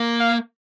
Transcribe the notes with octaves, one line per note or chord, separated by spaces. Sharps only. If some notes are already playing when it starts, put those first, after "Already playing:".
Already playing: A#3
F5